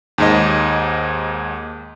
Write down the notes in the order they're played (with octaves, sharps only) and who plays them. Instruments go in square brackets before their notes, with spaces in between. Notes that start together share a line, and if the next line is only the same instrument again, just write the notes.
[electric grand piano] D#2 G#2 D#5